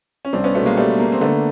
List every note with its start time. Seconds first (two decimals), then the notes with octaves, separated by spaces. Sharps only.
0.25 C#4
0.33 C2 C4 D4
0.44 B3 C#4
0.55 B2 A3 B3
0.65 G#3 A#3
0.77 G3 A3 B3
0.99 A#3
1.12 C4
1.21 D3 A3 B3